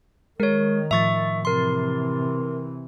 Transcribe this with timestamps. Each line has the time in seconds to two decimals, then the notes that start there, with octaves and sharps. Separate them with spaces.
0.40 D#3 G#3 A#4 C#5
0.91 A2 F3 E5 C#6 A6
1.45 C3 E3 A#4 C6